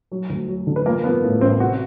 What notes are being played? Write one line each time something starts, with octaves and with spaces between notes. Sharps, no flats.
F#3
D2
F#3
D3
B4
F3 A#3 A#4
F3 B3 B4
A2
A1 C4 C5
C3 F#4